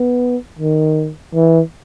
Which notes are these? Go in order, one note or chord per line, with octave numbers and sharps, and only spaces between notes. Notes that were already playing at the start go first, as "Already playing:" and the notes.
Already playing: B3
D#3
E3